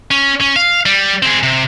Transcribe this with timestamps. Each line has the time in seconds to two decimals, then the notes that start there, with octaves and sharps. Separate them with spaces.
0.11 C#4
0.40 C#4
0.56 F5
0.86 G3
1.23 C4 G#4
1.43 C3